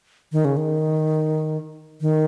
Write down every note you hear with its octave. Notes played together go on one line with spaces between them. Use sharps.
D#3
C#3
D#3
D#3